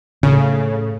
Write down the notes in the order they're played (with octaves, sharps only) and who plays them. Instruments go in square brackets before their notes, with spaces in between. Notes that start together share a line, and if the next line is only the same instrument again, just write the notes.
[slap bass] A2 [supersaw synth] C#3